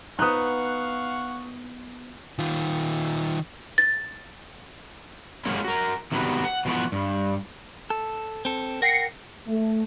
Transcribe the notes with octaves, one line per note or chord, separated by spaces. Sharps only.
B3 D#4 F5 F#5 C#6 D#6 F#6
D#3 F4
A6
F#3 G#3 A#3 C#4
F#4 A#4
C3 D#3 F#3 G3 B3 F#4
F#5
B2 E3 F3 G#3 B3 F#4
G2
A4
C4 A4
A#4 F#5 G5 A#6 C7 C#7
A3